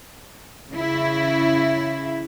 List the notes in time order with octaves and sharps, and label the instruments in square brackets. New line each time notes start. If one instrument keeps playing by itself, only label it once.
[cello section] C#3 E4